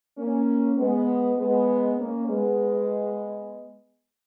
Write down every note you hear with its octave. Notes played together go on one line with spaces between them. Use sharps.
A#3 C#4
G#3 B3
G#3 B3
A#3 C#4
G#3 B3